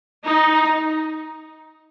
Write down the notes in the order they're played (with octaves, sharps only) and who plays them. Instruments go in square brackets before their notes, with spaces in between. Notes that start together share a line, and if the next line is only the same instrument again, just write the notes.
[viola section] D#4